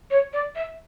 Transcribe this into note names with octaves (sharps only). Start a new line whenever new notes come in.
C#5
D5
E5